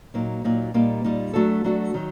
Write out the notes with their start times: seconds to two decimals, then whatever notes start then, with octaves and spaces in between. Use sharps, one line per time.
0.14 A#2 F#3 A#3 D#4
0.44 A#2 F#3 A#3 D#4
0.74 A#2 G3 A#3 D#4
1.04 A#2 G3 A#3 D#4
1.33 F#3 A3 D4 F#4 A4
1.64 F#3 A3 D4 F#4 A4
1.94 D#3 F#3